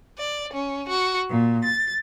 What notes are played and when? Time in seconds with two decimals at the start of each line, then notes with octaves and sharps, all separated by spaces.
0.18 D5
0.53 C#4
0.89 F#4
1.31 A#2
1.64 A6